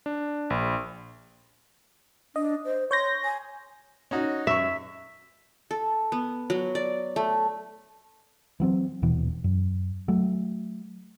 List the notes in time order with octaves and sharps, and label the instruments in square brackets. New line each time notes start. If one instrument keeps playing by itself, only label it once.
[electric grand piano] D4
A#1
[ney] D4 [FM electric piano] D#5
[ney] C5
[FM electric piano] C#5 G6 A#6 [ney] C6
[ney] G#5
[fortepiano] C#4 D#4 F#4
[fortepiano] F#2 C#6 [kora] E5
[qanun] A4
B3
F#3
D5
A3
[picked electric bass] E3 F#3 C4
D#1 B2 E3
F#2
F#3 A3